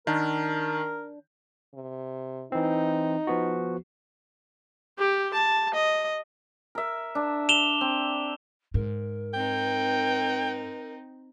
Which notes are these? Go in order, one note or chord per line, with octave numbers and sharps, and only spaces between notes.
D#3 D4 A#4
C3
E3 C4 D#4
F3 B3 F#4
G4
A5
D#5
A#4 E5
D4
E7 F7 G7
C4
G#2 A#4
C4 D#4 G5